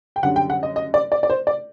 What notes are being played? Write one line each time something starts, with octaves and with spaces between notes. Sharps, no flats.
G5
F#2 D3 G3 D4 F#5
G5
F#5
D#5
D#5
D5
D5
D5
C5
D5